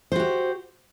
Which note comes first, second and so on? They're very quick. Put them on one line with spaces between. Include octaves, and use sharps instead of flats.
C5 F#4 G4